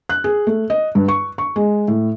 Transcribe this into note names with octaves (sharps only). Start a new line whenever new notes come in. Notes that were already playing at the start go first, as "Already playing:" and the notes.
F#6
G#4
A3
D#5
G2
C#6
C#6
G#3
A2